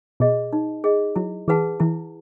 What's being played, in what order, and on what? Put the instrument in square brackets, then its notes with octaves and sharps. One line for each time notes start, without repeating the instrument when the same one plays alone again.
[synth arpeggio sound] B2 [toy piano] G#4 D#5
[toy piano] D#4
G#4 D#5
[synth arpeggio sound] F#3 [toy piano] E4
[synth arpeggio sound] E3 [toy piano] G#4 B4 F#5 A5
[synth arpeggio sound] E3 [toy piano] E4